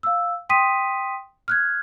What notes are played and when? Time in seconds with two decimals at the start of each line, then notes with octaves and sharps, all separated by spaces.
0.03 F5 E6
0.49 G5 C6 D#6 B6 D#7
1.48 F6 F#6 G#6